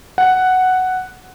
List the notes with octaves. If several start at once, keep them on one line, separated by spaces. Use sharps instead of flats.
F#5